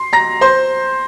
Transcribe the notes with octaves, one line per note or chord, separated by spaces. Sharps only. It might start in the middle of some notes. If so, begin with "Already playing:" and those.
Already playing: C6 C7
A#5 A#6
C5 C6